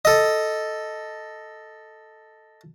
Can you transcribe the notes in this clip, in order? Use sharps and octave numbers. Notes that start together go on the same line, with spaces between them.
A4 D#5